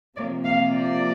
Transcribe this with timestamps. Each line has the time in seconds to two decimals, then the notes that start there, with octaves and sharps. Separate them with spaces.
0.16 C3 F3 A#3 D5
0.45 F5
0.74 D5